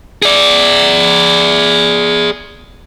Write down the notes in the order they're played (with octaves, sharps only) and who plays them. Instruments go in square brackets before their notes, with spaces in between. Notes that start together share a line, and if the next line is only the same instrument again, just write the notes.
[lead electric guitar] G#4 D5